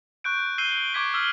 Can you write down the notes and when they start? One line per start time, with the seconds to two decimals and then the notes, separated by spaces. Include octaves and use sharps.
0.24 C#6 F#6 G6 D7
0.58 E6 G6 C7 D#7 G7
0.72 G6
0.93 C#6 D6 G#6 B6 D7
1.14 D6 E6 F6 G#6 B6 G7